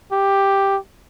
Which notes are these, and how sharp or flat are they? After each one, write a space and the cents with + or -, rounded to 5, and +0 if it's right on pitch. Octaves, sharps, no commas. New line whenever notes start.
G4 +5